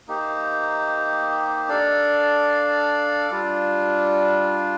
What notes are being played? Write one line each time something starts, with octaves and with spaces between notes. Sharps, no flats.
A#3 D#4 G4 C5
D4 A4 D5 F5
G3 D4 F4